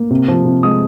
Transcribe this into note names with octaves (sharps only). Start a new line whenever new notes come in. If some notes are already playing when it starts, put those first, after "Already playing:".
Already playing: A#3
C3
F3
C3
G#3 D#6